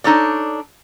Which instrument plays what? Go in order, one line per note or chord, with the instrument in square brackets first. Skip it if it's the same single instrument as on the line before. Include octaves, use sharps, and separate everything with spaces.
[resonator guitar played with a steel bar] D4 D#4 A4 C#5 D5